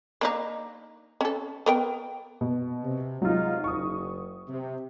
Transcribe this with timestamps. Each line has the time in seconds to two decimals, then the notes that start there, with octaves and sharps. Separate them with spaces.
0.21 A#3 D4 D#4
1.21 C#4 A4
1.66 B3 A#4 G5
2.41 B2
2.83 C3
3.22 C3 F#3 G#3 D#4 F4
3.64 F#1 C#6 D#6
4.49 C3